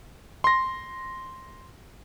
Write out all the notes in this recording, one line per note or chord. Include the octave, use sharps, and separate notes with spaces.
C6 A#6